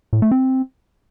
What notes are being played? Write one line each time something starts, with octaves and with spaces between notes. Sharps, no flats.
A2
A3
C4